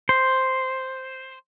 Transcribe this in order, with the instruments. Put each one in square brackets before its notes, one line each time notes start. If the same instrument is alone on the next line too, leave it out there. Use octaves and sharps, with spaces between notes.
[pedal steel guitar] C5